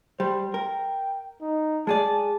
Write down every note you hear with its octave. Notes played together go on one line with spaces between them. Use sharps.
G3 C5
A#4 G5
D#4
G#3 G#4 D5 A5